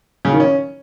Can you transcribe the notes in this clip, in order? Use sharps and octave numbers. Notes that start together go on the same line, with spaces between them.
C#3
D#3
C#4